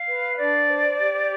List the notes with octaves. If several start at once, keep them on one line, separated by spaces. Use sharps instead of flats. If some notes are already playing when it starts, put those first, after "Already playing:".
Already playing: F5
B4
D4 D5
C5
G4